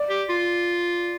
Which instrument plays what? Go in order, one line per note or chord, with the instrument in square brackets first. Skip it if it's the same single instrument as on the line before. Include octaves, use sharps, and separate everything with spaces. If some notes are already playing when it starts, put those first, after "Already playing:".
Already playing: [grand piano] D5
[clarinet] G4
F4